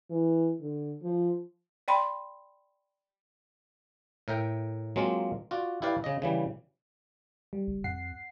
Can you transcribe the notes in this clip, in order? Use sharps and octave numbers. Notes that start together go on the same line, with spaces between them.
E3
D3
F3
D5 G5 B5 C6
A2 A#4 E5 G5
F#3 G#3 A#3 C4 F4
F4 F#4 D5
E4 G4 B4 D5 F5
C#3 D#5
C#3 E3 G3
G3
F#1
F2 F#5 C7